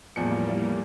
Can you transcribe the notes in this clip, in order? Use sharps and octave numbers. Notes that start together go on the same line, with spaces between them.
E2 A2 F3 G3 A#3 C#7